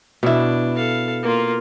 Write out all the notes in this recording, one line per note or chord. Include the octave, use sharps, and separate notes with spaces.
B2 D4 E4
A4 F5
A#3 F4